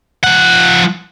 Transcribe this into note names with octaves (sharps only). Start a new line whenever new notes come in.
F3 F#5